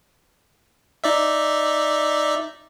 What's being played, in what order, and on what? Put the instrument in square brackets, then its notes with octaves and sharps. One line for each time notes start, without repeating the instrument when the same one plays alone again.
[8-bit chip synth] D#4 D5 E5